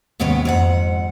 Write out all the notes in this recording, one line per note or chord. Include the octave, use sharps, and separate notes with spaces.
D#2 G#2 C3 B3 C#4 C#5
F2 G#2 F#5